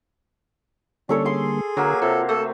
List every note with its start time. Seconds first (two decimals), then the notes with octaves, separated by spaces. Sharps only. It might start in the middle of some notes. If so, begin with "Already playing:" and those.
1.09 D3 G3 A#3 C#4 D4 A4 C#5
1.25 G#4 C6 D6
1.77 D3 F#3 A#3
2.02 C3 F4 A4
2.29 A3 A4 E6